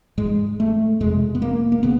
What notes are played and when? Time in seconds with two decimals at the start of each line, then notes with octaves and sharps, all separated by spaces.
0.17 G#2 G#3
0.60 A3
1.00 F2 C3 G#3
1.35 B3
1.42 A#3
1.72 A#3
1.83 C#3 B3